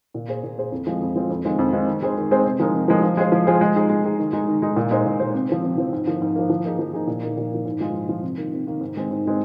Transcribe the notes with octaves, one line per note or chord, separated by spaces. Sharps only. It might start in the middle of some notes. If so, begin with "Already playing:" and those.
A#2
A#3 G#4 C5
A#2
A#3 G#4 C5
F2
F3 G#3 C4 F4
F2
F3 G#3 C4 F4
F2
D#3 G#3 C4 F4
F2
D#3 G#3 C4 F4
D#3
G#3 C4 G#4 C5
D#3
G#3 C4 G#4 C5
C3
F3 G#3 D#4 A#4
C3
F3 G#3 D#4 A#4
F3
G#3 F4 G#4 C5
F3
G#3 F4 G#4 C5
G#3
D#4 G#4
G#3
D#4 G#4
D#3
G#3 D#4
D#3
G#3 D#4
A#2
G#3 D#4 C5
A#2
G#3 D#4 C5
C3
F3 C4
C3
F3 C4
G#2
F3 A#3
G#2
F3 A#3
F3
A#3 D#4 G#4
F3
A#3 D#4 G#4
A#2
F3 A#3 D#4
A#2
F3 A#3 D#4
G#2
F3 G#3 F4
G#2
F3 G#3 F4
C3
D#3 A#3
C3
D#3 A#3
G#2
D#3 G#3 C4
G#2
D#3 G#3 C4